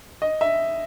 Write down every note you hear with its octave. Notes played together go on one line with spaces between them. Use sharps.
D#5
E5